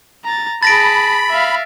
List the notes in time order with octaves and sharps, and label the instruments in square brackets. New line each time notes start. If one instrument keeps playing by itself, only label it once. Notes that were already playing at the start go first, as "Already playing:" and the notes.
[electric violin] A#5 A6
[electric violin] G#4 A5 [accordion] B5 [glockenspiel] A6 A#6 D7
[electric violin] E5 F5